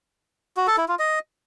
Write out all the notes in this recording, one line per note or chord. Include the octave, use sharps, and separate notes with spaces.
F#4
A4
E4
F4
D#5